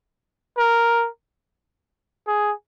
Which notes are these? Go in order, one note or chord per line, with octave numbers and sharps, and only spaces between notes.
A#4
G#4